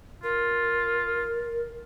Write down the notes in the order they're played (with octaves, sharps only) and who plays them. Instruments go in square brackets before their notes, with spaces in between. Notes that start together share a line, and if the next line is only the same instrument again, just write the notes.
[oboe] F4 [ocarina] A#4